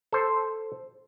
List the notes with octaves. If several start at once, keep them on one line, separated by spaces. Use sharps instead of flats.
A4 C5